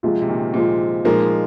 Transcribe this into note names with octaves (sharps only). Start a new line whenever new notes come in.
C3 F3 G#3 F4
C3
A#2 D#3
A#2 F3 G#3 F4
A#2 F3 G#3 A#3 D#4 A#4